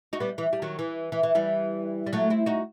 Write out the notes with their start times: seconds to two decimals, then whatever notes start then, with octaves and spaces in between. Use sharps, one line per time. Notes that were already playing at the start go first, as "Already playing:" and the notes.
0.13 D#4 F#4
0.20 G3 B3
0.38 E3
0.53 G3
0.62 D#3 F#3
0.79 E3
1.12 E3
1.23 E3
1.35 E3 G3
2.07 G3
2.13 F#3 A3
2.30 C4 E4
2.46 D#4 F#4